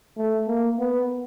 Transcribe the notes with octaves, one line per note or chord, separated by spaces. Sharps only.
A3
A#3
B3